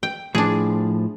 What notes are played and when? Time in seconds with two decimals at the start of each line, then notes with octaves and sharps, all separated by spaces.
0.03 G5
0.35 A2 F3 D4 G#4